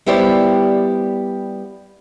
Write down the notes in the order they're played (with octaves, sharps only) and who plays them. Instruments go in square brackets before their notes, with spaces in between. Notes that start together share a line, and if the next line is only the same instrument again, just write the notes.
[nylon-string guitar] G3 B3 E4 G4 C5 D5